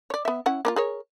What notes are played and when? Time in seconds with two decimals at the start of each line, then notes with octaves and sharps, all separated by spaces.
0.10 C#5 D5
0.25 B3 E5
0.46 C#4 E4 F#5
0.65 A#3 D4 F4
0.76 G#4 A#4 C#5